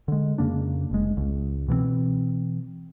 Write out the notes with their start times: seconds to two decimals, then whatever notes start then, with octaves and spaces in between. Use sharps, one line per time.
0.08 D3 G#3
0.38 F2 C#3 A#3 D4
0.91 F1 G#3
1.17 C#2
1.68 B2 E3 F#3 C4